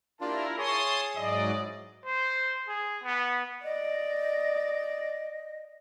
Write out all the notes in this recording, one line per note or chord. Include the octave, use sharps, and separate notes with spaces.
A#3 D4 E4 F4 G4 A#4 A5
E4 G#4 C#5 A5 C6 D#6
G#2 F#3 E4 D5 D#5
C5
G#4
B3
D5 D#5